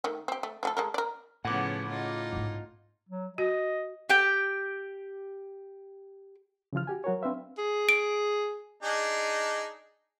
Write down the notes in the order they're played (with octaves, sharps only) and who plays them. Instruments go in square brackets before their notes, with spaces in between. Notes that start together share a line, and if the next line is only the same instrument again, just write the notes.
[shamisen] D#3 A3
C4 G4
A3
F3 A3 A4
G#3 A4 A#4
A#4 D5
[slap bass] A2 [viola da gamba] C#3 F3 B3 [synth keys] F#5 D6
[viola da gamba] D#4 F4
[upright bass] G#2 A#3
[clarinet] F#3
[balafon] F#4 [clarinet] D#5
[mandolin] G4 G5
[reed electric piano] C#3 E3 F3 F4 F6
F#4 G4 G#5
F#3 F#4 A#4 C#5
C4 D4 B4 C5 E5 F5
[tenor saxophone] G#4
[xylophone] D7
[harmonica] D4 D#4 G#4